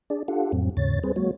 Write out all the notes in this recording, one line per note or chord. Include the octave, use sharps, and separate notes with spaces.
D4 G#4 D5
D4 F4 G4 A4 F5 F#5
F2 A2 F#3 C4
D#2 G#2 C#3 C#5 A6
G3 C4 G#4 B4 C5
F#3 G#3 A#3 F#4 C#5